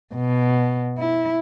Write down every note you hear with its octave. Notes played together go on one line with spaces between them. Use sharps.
B2
E4